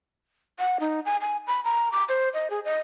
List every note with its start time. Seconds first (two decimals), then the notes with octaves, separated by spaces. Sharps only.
0.59 F#5
0.80 D#4
1.05 G#5
1.21 G#5
1.47 B5
1.64 A#5
1.92 D6
2.09 C5
2.34 D#5
2.50 G#4
2.65 D#5